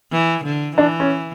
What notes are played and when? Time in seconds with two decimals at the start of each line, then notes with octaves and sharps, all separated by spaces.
0.12 E3
0.45 D3
0.77 E3 D4
1.00 C#4